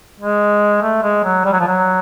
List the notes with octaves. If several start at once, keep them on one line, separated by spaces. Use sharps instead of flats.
G#3
A3
G#3
F#3
G3
F#3
F3
F#3